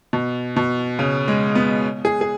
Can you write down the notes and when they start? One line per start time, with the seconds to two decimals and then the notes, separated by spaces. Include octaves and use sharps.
0.13 B2
0.57 B2
0.99 C#3
1.28 G#3
1.55 B3
2.05 G#4
2.21 G#4